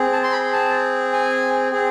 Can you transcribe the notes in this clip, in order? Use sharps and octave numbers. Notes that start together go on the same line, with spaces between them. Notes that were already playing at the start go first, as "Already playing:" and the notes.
Already playing: C4 G#4
A5
C6
B5
A5
G#5
C4 G#4